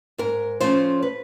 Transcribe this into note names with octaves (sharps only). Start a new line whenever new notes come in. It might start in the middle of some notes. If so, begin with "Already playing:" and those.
G#2 A#4
F3 A3 C#4 C5
B4